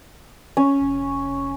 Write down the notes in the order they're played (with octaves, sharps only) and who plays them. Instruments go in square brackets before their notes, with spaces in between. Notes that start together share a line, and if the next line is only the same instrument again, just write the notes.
[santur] C#4
[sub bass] F1